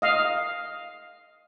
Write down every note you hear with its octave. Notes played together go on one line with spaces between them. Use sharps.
D#5 F5